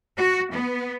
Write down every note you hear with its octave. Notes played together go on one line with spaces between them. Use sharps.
F#4
B3